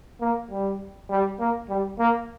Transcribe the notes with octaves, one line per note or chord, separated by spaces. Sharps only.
A#3
G3
G3
A#3
G3
A#3